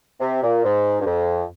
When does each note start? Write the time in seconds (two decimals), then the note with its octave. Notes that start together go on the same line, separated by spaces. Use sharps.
0.20 C3
0.43 A#2
0.64 G#2
1.01 G2
1.05 F2